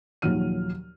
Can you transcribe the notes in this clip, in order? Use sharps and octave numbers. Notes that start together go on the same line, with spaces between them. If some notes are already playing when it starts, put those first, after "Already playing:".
D#2 A#2 F3 F#3 F6 D#7